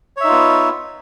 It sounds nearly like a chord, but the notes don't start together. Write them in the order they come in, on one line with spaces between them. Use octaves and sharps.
C#5 E5 D#4 F4 B3